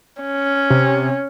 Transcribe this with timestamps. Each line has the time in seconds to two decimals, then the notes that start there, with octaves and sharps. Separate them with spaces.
0.22 C#4
0.70 C3